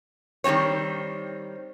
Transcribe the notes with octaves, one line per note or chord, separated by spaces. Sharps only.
D#3 G3 B3 C4 C#5